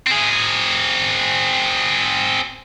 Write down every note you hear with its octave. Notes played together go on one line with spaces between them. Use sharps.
C4 G#4